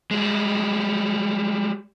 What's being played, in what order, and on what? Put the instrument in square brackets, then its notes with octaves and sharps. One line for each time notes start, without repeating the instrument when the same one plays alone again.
[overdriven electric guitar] G3 G#3